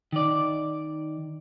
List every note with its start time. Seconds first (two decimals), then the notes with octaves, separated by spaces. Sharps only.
0.12 D#3 D5